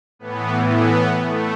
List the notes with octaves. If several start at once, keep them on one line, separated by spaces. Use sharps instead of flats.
A2 E3 B3
B3
A3